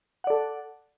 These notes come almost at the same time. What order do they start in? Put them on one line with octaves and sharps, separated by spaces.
F#5 D5 A4